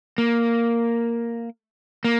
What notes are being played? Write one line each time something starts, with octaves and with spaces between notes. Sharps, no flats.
A#3
A#3